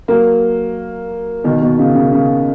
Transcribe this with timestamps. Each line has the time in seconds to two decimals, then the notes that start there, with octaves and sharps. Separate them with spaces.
0.08 F#3 A#3
1.44 B2 D#3
1.62 B2
1.79 C#3
1.95 C#3
2.13 C#3